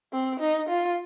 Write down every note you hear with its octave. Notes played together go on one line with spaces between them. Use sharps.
C4
D#4
F4